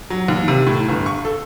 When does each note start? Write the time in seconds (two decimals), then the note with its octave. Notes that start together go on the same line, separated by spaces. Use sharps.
0.10 F#3
0.28 D#2
0.48 C3
0.67 A2
0.89 G1
1.06 C#6
1.25 A4